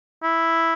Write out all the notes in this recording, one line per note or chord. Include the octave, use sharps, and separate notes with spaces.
E4